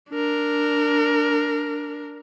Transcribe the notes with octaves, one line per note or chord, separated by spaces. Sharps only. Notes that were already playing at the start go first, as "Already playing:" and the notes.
D4 A#4